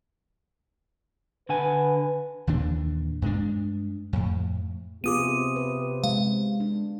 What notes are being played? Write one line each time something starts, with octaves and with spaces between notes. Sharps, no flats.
D3 B4 F#5 G#5
D#2 A#2 E3 D4
G2 G#3 D4
F2 A2
C3 B3 F4 G#4 D6 D#6 D#7
B4
G#3 F5
D4